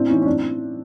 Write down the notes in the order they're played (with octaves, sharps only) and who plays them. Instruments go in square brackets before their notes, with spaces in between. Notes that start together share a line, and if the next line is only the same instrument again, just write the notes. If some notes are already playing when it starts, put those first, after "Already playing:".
Already playing: [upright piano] A2 C4 D4
E3 C#4 D#4
C#4
A2 C4 D4